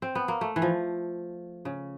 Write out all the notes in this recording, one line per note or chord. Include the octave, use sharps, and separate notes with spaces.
C4
B3
A#3
A3
E3
F3
C#3